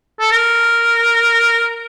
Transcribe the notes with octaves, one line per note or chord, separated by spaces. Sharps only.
A4
A#4